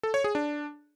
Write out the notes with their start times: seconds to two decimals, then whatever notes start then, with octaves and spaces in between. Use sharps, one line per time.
0.03 A4
0.14 C#5
0.24 G#4
0.35 D4